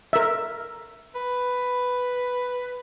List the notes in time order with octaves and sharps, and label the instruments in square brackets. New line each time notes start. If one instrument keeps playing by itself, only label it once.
[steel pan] A#4 E5
[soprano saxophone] B4